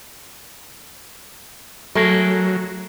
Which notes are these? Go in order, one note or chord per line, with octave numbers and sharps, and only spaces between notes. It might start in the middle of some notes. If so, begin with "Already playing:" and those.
F#3 A3 G#4 A#4